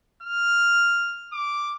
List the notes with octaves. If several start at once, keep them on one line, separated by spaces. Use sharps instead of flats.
F6
D6